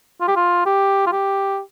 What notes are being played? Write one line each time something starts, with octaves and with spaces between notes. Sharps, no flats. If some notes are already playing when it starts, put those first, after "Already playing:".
F4
G4
F4
G4
F4
G4